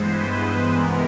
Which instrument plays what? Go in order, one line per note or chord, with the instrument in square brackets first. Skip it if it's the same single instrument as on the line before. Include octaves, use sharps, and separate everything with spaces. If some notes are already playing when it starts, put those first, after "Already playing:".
Already playing: [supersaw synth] G2 E3 G#3 B3 C5
B4
C3 E3 G#3 B3 A#4